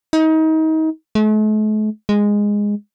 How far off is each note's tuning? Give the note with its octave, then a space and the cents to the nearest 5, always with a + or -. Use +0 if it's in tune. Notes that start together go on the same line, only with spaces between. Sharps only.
D#4 +30
A3 -45
G#3 -10